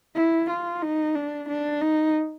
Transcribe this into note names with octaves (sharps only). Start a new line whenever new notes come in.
E4
F4
D#4
D4
D4
D#4